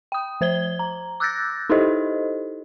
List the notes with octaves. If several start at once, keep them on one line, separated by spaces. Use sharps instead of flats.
G5 D#6
F3 C5 G#6 G7
A#5
D6 E6 F#6 G6 A6 A#6
D#4 E4 G4 A4 C5 D#5